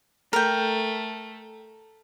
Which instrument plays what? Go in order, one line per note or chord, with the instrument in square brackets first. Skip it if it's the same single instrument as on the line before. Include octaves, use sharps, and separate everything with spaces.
[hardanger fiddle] A3 [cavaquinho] A#4 G5